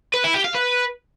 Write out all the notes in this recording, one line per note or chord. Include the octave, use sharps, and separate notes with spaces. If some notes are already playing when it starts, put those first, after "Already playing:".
B4
E4
G4
F5
B4